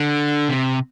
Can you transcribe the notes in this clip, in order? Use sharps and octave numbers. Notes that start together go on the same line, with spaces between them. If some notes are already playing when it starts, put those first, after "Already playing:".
Already playing: D3
C3